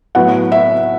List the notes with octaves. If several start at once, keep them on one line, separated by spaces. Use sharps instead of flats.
A2 F#3 B3 F#5
E5